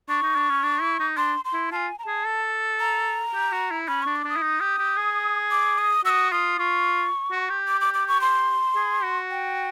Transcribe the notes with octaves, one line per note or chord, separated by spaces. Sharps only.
D4 C#6
D#4
D4
C#4
D4
E4
D#4
D4 C6
C6
E4
F4 G#5 A5
A#5
G#4 A5
A4
A#5
G4
F#4
E4
C#4 B5
D4 C#6
D6
D4 D#6
E4
D#4
G4
G4
G#4
D6
D#6
F#4 D#6 E6
F4 D#6
F4 C#6
F#4
G4
D6
D6
D6
C#6
C6
G#4
F#4
G5